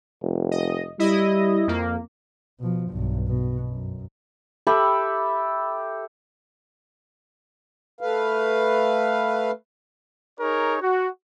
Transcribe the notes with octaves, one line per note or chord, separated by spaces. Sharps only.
F1
D#5
G3 E4 D#5
F2 A#3
B2 F3
B1 G2
B2
F#2
G4 A4 E5 B5
A3 B4 F5
D#4 G#4 A#4 C#5
F#4